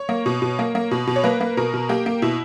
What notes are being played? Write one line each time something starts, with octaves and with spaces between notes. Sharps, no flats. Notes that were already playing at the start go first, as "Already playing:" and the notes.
Already playing: C#5
A#3
B2
B2
A#3
A#3
B2
B2
C#5
A#3 B4
A#3
B2 A#4
B2
A#3 G4
A#3
B2 E4